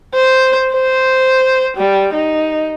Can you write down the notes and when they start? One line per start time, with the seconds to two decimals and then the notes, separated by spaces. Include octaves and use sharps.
0.15 C5
0.73 C5
1.77 G3
2.13 D#4